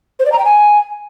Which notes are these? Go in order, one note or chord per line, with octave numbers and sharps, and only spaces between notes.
C5
D5
A#5
G5
G#5